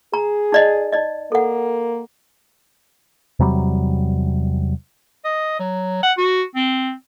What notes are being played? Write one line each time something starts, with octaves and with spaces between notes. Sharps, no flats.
G#4 A#5
D#4 D5 D#5
D#4 D5 D#5
A#3 A4 F#5
E2 C3 F#3 G3
D#5
F#3
F#5
F#4
C4